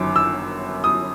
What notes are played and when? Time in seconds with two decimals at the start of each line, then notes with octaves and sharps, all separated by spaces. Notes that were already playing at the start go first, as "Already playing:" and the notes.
Already playing: G1 F#2 D#3 F#3 D6
0.16 E6
0.84 D#6